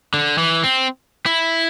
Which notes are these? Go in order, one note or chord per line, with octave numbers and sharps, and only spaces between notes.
D3
E3
C4
E4